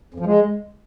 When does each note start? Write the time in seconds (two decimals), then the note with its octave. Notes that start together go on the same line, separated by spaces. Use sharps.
0.14 F2
0.20 F3
0.25 G#3